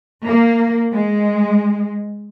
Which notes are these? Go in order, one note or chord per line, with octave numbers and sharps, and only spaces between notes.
A#3
G#3